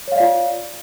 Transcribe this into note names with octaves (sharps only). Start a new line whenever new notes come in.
F4 C#5 D5 F5